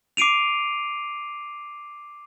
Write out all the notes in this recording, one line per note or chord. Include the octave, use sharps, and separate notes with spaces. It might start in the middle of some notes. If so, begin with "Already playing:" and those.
D6 C7 D7 D#7 F7